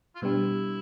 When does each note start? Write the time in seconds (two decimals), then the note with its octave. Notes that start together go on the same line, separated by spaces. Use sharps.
0.16 F4
0.22 B2 G3 B3 D4 E4 G4